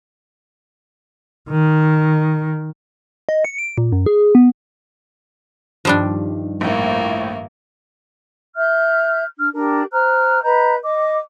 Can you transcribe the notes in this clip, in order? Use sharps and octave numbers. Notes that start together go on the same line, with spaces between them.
D#3
D#5
C#7
D7
A#2
F#2
G#4
B3
G2 D#3 F3 G3 D4
A#1 A2 A#3
E5 F6 G6
D4 F6
D4 G4 A#4
C5 A#5 F6 F#6
B4 D#5 A#5 G6
D#5 D6